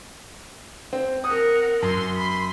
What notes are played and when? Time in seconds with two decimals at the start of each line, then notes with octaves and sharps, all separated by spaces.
0.93 C4
1.24 A#4 F#5 D#6
1.82 F#2 C6
2.15 B5 C6